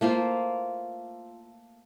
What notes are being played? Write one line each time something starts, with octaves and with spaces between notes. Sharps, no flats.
A3 A#3 F4 C5